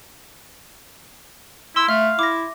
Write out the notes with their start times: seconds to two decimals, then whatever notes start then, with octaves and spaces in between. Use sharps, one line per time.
1.76 E4 C6 E6
1.89 A3 E5 F5
2.19 E4 D6 A#6